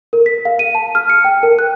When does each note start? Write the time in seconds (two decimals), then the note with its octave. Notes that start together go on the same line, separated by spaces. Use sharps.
0.13 A#4
0.26 B6
0.45 F5
0.59 D#7
0.75 A5
0.95 F6
1.10 C#7
1.25 G5
1.43 A#4
1.59 F#6